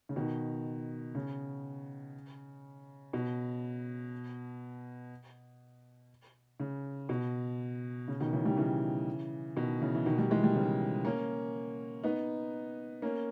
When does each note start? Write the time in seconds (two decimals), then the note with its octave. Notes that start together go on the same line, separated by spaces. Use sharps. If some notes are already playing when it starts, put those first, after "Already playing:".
0.09 C#3
0.16 B2 D#3
1.15 C#3
3.13 B2
6.60 C#3
7.09 B2
8.08 C#3
8.20 B2 D#3
8.33 C#3 E3
8.45 D#3 G3
8.57 C#3 E3
9.56 B2 D#3
9.81 C#3 E3
9.95 E3
10.06 B2 D#3
10.18 D#3 G3
10.30 E3 G#3
10.43 D#3 G3
10.55 C#3 E3
11.05 A#3 C#4
12.04 B3 D#4
13.02 A#3 C#4